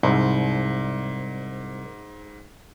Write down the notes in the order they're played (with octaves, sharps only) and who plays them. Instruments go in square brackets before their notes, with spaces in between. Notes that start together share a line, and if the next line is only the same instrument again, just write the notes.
[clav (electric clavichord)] C2 [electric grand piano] G#2